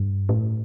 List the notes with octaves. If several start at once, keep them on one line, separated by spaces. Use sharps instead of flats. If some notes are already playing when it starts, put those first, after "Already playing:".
Already playing: G2
A2